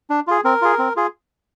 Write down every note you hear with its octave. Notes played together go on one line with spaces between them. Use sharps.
D4
F4 G#4
C4 A#4
F4 G#4
C4
F4 G#4